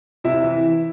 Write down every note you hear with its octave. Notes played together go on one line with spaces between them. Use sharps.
C3 E4 E5
E3